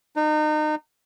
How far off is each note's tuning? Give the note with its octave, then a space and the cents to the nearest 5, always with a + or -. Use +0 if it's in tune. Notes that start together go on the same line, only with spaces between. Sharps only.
D#4 -30